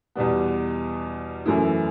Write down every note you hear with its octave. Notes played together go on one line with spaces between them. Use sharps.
E2 B2 G3 B3
F#2 E3 A3 E4